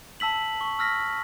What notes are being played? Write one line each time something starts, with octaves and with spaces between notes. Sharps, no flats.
A5 E6 B6 F#7
C#6
E6 F6 A#6 B6